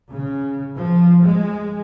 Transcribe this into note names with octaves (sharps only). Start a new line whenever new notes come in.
C#3
F3
G#3